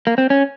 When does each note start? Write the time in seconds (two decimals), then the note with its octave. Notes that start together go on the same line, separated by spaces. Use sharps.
0.07 A#3
0.18 C4
0.30 C#4